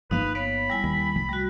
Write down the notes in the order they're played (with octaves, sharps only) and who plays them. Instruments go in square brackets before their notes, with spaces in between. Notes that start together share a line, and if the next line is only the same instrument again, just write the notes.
[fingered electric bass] G1 F3 A#3 [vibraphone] D#4 F5 [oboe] B4
[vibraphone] B3 C#5 F5 [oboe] B5
[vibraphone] G3 E4 G#5
[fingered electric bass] D#2
C2 F3 A3
[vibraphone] G3 F#4